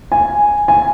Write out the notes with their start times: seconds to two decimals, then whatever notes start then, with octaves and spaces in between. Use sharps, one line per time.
0.12 G#5
0.68 G#5